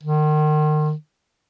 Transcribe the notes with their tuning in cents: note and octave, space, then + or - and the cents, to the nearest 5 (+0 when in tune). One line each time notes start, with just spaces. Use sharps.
D#3 -35